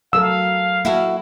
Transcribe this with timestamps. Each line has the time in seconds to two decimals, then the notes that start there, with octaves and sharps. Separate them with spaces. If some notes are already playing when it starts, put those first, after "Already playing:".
0.13 F#3 A4 A#4 F5 E6
0.85 A#3 E4 F#4 A4